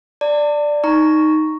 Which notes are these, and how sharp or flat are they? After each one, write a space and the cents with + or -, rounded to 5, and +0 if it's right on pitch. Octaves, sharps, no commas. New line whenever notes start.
D5 +0 A5 +40
D#4 +0 A#5 +0 C#6 +0